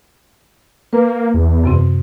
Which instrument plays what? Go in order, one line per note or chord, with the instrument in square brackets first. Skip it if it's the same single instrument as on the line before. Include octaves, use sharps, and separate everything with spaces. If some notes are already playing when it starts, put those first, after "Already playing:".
[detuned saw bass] A#3 [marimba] B4
[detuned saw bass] E2
[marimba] F#2 C3 C4